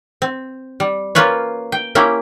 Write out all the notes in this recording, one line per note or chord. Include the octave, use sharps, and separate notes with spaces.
C4
G3
A#3 C#4 F4 B4 C#5
G5
A#3 C#4 E4 G4